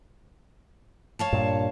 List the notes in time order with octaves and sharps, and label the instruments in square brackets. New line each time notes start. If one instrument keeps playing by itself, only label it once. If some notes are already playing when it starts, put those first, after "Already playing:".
[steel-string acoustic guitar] C#5 F5 A5
[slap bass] G2 A#2